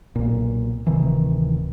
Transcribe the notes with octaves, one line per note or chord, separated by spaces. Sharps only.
B1 A#2
D1 C3 D#3 E3